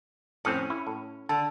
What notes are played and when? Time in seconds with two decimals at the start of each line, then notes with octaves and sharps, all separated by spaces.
0.45 F2 A2 C4 C#4
0.70 E4
0.87 A2
1.29 D3 A5